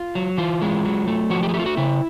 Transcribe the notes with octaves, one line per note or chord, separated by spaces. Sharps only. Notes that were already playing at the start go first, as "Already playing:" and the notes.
Already playing: F4
F#3
E3 F4
G#3
F#3
A3
F3 F#4
G4
G#4
A3 G4
F4
F#4
C#3 E4